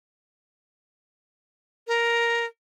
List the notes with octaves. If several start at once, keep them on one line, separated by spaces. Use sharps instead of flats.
A#4